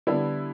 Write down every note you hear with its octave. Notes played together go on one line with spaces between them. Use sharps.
D3 G3 B3 E4